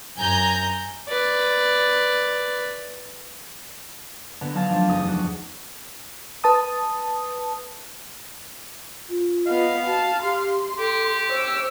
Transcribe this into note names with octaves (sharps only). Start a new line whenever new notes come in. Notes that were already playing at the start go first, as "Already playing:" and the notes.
F#2 G#5 A#5 G6
B4 D5
D3 B3 A#5
F#3 D#4 F5 A5 A6
F3 A3 D4
F#1 E2 D#4 D#6
F#4
B4 A5 D#6
F4
B3 D#5 F5
F#4 A5
G4 C6
G4 A4
C5 C#5 E6